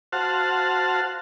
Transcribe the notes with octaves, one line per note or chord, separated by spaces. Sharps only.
F#4 C5 F5 F#5 A5